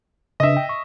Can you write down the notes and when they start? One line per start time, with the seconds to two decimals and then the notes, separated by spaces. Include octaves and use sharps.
0.40 C#3 D4 D#5 E5
0.57 G5
0.69 C#6